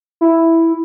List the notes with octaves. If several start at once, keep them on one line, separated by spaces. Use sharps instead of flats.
E4